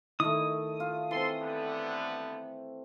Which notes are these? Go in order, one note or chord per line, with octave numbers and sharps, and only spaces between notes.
D#3 A3 D#4 E4 D#5 D#6
F4
E3 C4 A4 C6
D3 G3 B3